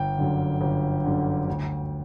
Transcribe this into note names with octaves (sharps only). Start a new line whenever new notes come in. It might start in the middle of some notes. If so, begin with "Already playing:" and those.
Already playing: G1 G5
F#2 D3
G1
F#2 D3
D2